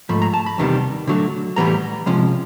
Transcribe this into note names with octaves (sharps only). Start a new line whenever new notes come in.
G#2 F3 A3 B5
A#5
A5
B5
E2 C3 D#3 G3 B3
D3 F#3 A3
A2 E3 G3 B3 A#5
C3 F3 G#3 C#4